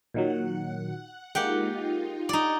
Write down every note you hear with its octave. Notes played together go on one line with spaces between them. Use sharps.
A#2 D#3 F#3 F#5
G#3 A#3 D#4 F4 G4 F#5 G5
D#4 D5 D#5 F#5 G#5